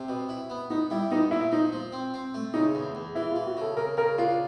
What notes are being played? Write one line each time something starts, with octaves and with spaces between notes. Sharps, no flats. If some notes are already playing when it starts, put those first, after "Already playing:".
Already playing: C3
B2
E4
B3
B3 D#4
G3 E4
B2 D#4
A#2 E4
F3 D#4
F3
C4
C4
A3
C#3 D#4
E2
E2
E3 E4
F4
E3
F#4
C#3 A4
C#3 A#4
C#3 A#4
D4 F4